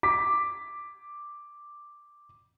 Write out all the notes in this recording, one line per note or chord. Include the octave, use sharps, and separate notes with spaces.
D6 B6